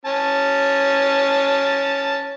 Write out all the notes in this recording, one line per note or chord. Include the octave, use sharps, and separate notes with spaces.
C#4 A5